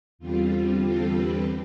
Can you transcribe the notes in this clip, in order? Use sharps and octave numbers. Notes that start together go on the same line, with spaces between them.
E2 D3 G3 C4 F4
F4 A4
G4 B4